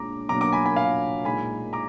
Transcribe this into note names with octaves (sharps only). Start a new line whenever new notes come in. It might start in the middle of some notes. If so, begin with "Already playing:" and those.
Already playing: A#2 G#3 D4 A#5 D6
B2 F#3 A#3 D4 A#5 D6
A#5 D6
G#5 B5
G#5 B5
F5 G#5
A#2 G#3 D#4 G#5 B5
A#5 D6